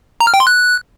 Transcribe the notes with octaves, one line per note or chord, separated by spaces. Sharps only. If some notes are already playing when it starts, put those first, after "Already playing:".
A#5
F6
G5
C6
F#6